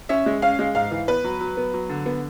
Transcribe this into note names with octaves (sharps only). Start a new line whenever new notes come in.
C#4 E5
G#3
C#4 F5
G#3
G#2 F5
E3
B3 B4
F#3
F#3
B3
F#3
D3
B3